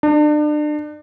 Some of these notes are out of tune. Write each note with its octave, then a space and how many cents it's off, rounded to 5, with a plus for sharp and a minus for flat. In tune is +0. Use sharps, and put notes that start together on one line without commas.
D4 +35